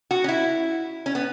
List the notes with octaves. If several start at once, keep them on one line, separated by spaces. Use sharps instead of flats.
F#4
C#4
E4
C#4
B3